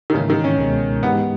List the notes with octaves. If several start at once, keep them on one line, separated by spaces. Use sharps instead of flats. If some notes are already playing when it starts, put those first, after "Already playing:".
D#3
G#2 C#3 E3 A#3 C#4 E4
D#3
C#4
C#2 B2 G#3
G#2 E3 G#3 B3 D#4 G4